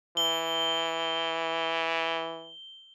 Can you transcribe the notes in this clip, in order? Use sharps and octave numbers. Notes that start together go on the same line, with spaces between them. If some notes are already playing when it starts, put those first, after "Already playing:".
E3 G7